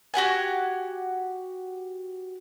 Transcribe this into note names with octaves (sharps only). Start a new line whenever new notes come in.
F#4 G4 F#5 G#5